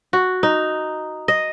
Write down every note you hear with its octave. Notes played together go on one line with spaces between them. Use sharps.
F#4
D#4
D#5